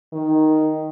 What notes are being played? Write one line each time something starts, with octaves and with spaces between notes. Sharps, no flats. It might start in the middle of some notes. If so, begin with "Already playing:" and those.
D#3